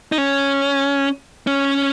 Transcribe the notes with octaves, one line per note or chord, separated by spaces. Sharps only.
D#4
C#4
C#4